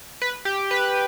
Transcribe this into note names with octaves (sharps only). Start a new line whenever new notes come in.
B4
G4
B4